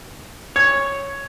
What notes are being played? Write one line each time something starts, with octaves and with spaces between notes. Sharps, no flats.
C#5 G#6